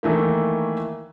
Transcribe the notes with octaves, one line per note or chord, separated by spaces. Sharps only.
D#3 E3 A3 A#3